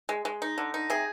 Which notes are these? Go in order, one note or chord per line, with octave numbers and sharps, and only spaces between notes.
G#3
G#3
D#4
D3
D#4
C3 G#4